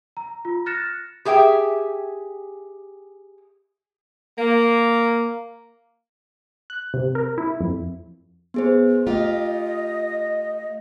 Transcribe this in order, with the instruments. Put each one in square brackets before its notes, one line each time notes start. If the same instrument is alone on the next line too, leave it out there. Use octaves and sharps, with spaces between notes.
[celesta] A#5
F4
F6 F#6 A6 A#6 C#7 E7
[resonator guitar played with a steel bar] G4 G#4 E5 G5
[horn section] A#3
[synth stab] F#6
C3
A#4
E4
F2
[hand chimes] B3 G#4 C5
[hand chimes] A3 [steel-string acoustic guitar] F4 G4 [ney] D#5